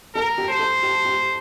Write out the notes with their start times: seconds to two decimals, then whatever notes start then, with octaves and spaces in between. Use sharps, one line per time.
0.15 A4 A#4
0.38 G4
0.49 C5
0.59 A4
0.83 G4
1.05 G4